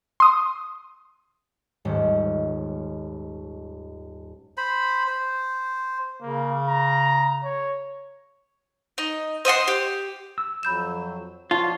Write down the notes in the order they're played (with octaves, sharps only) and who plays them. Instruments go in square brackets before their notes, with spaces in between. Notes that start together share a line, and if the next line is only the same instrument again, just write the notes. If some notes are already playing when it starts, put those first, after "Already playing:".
[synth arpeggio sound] C6 D#6
[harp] D#1 G#2 C#4
[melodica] C5 B5
C5
[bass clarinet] C#3 [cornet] A#3
[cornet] A#5
C#5
[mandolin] D#4
C5 D#5 F#5 C6
G4
[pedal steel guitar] E6
[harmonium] F2 F#3 [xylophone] B5 G6 E7
[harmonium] F3 F#4 C#5 [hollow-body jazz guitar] F4 [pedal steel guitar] D5 [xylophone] A5